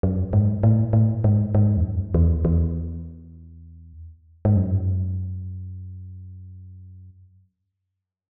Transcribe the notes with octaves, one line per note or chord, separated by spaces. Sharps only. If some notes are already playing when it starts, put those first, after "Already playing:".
F#2
G#2
A2
A2
G#2
G#2
E2
F#2
E2
E2
G#2
F#2